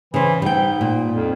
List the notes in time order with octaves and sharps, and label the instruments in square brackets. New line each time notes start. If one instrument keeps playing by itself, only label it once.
[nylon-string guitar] C#3 C5 [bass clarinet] E3
[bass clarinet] G#2 [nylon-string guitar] G3 G5
[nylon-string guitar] A#2
[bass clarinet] F2